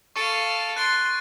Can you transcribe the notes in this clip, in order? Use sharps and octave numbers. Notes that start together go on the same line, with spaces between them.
A4 F5 C#6 D7 D#7
C6 F#6 A6 D7